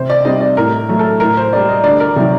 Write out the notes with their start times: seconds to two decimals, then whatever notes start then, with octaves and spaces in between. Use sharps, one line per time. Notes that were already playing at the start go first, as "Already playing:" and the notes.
Already playing: C3 C5
0.10 D5
0.25 G3 C4 D#4 D#5
0.40 D5
0.57 A2 A#4
0.89 F#3 A3
0.99 A4
1.20 A2 A#4
1.37 C5
1.52 G3 A#3 D5
1.69 D#5
1.84 D2 D5
2.00 A#4
2.16 C3 D#3 F#3